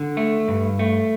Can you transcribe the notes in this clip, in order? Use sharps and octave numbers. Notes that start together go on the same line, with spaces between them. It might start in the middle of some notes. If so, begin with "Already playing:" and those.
Already playing: D3
A3
G2
A3